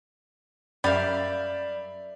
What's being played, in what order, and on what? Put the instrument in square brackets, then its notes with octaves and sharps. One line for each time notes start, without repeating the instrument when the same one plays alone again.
[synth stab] F#2 [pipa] G3 A#3 F5 [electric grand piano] D5 E5 [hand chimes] B5 G6